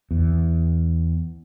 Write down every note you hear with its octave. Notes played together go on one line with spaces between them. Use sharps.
E2